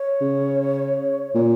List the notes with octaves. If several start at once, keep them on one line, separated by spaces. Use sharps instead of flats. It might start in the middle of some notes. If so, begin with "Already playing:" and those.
Already playing: C#5
C#3
A#2